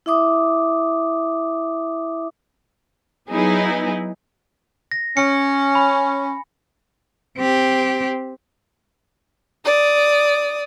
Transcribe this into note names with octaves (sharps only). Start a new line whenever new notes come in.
E4 E5 D6 D#6
F#3 B3 D#4 E4 G#4 B4
A#6
C#4 G#5 C#7
B5
C4 G4
D5 D#6